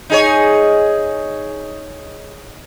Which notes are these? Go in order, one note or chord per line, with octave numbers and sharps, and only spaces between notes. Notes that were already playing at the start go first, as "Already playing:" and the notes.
D#4 G#4 C#5